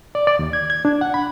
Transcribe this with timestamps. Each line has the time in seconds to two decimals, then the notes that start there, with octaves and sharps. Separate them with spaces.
0.15 D5
0.27 D5
0.39 D#2
0.53 G#6
0.70 G#6
0.85 D4
1.01 F#5
1.14 B5